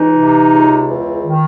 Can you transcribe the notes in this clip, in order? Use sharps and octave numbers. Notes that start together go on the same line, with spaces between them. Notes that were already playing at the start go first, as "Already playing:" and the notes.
Already playing: C#2 E3 D#4
C3
C#2
E2
D#3